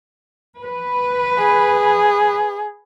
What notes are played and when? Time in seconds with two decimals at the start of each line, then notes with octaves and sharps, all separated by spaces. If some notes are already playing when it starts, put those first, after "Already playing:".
0.62 B4
1.38 G#4